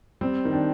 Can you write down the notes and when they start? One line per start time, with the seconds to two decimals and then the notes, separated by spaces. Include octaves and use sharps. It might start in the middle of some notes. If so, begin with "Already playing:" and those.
0.21 G3 C4
0.45 D#3
0.53 D4